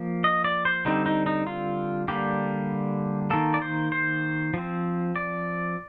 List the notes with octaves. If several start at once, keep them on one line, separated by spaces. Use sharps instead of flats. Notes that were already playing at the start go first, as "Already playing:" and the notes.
Already playing: F3 A#3
D#5
D5
C5
D3 G3 C4 D#4
D#4
D#4
F4
D3 G3 A#3 G4
D#3 A#3 A4
D5
C5
C5
F3 C4
D5